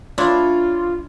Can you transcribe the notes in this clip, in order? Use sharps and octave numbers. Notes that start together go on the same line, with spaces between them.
D4 E4 F4 C#5 D5 C6